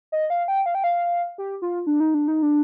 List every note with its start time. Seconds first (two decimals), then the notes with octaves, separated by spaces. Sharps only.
0.12 D#5
0.30 F5
0.48 G5
0.66 F5
0.75 G5
0.84 F5
1.38 G4
1.62 F4
1.87 D4
2.00 D#4
2.14 D4
2.28 D#4
2.42 D4